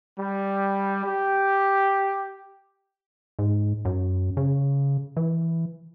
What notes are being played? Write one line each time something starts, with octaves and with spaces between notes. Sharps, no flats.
G3
G4
G#2
F#2
C#3
E3